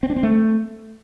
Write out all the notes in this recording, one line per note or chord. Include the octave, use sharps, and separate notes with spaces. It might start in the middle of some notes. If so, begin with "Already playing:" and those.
C4
D4
C4
A3